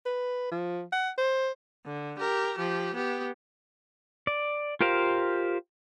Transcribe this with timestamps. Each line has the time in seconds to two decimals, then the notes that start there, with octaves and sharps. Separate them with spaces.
0.06 B4
0.51 F3
0.92 F#5
1.18 C5
1.85 D3
2.19 G4 A#4
2.57 F3 G4
2.95 B3 G4
4.27 D5
4.81 F4 G4 A#4 C5 F5